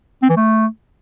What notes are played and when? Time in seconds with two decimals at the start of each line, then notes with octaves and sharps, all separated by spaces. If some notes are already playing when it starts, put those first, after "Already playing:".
0.23 C4
0.29 E3
0.36 A3